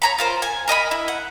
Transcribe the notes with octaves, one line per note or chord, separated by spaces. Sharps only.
C#5 A#5 B5
F4 A#4 C5
G#5
A#4 D#5 G5 B5
E4
F#5